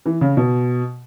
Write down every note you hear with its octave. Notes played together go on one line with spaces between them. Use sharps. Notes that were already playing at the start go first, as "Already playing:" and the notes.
E3
C#3
B2